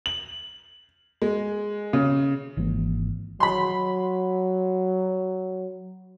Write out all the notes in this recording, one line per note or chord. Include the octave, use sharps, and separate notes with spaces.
F#7
G#3
C#3
G#1 E3 G#3 A#3
F#3 B5 C6